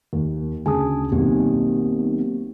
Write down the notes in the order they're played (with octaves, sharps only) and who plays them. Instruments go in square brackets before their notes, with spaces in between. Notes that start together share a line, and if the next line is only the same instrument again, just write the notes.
[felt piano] D#2 A#3
[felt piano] D2 C#3 G#4 [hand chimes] G#5 A5 D#6
[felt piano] B1 D#3 [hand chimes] A#3 C4 G4